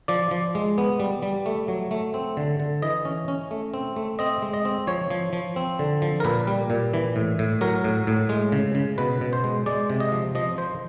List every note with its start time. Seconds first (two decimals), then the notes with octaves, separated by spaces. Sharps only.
0.08 F3 D5
0.31 F3
0.55 G#3
0.78 B3
1.00 G3
1.23 G3
1.46 A3
1.68 F#3
1.91 A3
2.14 C4
2.37 D3
2.60 D3
2.82 E3 D#5
3.05 C#4
3.28 C#4
3.51 A3
3.74 C4
3.96 A3
4.19 C4 D#5
4.42 G#3
4.53 D#5
4.65 C4
4.87 F3 C#5
5.10 F3
5.33 F3
5.56 C4
5.79 D3
6.02 F3
6.20 A#4
6.24 A#2 B4
6.47 G3
6.70 A#2
6.93 E3
7.16 A2
7.39 A2
7.61 F#3 A#4
7.84 A2
8.07 A2
8.29 G#3
8.52 C#3
8.75 C#3
8.98 B2 B4
9.21 B2
9.33 C5
9.44 G#3
9.66 G#3 D5
9.90 C3
10.00 D#5
10.12 F3
10.35 F3 D#5
10.58 F3 C5